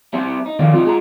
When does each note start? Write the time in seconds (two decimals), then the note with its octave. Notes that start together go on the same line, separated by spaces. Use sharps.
0.13 G3 C4 E5
0.46 D#4
0.59 F2 D#3 F4 D5
0.74 C3 G3 D#4 F4
0.85 G#3 A#5